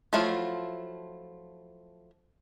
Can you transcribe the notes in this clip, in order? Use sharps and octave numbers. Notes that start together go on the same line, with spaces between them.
F3 F#3 A3 E4 F4